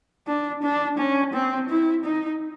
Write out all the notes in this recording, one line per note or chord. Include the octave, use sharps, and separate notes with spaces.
D4
D4
C#4
C4
E4
D#4